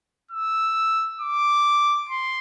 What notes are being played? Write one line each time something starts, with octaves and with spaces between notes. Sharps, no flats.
E6
D6
C6